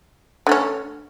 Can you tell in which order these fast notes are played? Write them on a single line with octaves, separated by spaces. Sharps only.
D3 A3 C#4